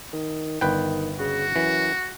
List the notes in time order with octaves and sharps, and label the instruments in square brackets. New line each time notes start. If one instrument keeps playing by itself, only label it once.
[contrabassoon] D#3
[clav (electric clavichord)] G1 B4 G5 [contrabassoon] D#3
[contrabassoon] C#3 [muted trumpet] F#4
[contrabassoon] F#2 [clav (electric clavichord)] E3